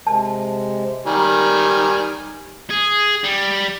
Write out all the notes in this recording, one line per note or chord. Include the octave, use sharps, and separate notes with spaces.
C3 G#3 A5
D#3 G3 G#5
G#4
G3